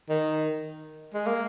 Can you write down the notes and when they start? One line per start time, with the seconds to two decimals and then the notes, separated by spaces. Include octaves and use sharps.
0.09 D#3
1.14 G#3
1.26 A#3